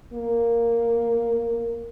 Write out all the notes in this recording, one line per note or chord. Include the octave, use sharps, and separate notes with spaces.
A#3